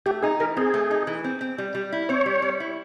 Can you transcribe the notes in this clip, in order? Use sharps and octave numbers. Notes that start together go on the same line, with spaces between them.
A3 G4
D#4 G#4
E3 A#4
C4 G#4
A3
D#4
E3
C4
C4
G3
G3
E4
C4 C#5
G3
G3
E4